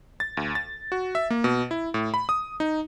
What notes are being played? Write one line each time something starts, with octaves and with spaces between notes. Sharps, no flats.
A6
D2
A6
F#4
E5
A#3
B2
E4
A2
B5
D#6
D#4